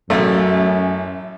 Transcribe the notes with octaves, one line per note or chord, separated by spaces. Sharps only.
A1 F#2 A3